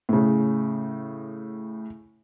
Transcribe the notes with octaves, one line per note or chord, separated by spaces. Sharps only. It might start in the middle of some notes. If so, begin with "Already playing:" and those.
A2 C#3